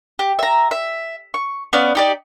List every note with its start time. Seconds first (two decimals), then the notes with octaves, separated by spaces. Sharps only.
0.19 G4
0.39 E5 A#5
0.71 E5
1.34 C#6
1.73 B3 C#4 D5 F5
1.95 D#4 G4 D5